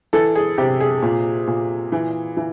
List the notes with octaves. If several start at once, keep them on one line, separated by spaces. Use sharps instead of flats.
E3 A4
G#4
C3 G4
G#4
A#2
A#2
E3
E3